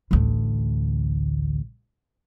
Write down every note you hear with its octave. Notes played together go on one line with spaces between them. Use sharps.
A1 D2